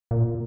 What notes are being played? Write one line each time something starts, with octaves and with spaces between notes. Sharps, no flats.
A#2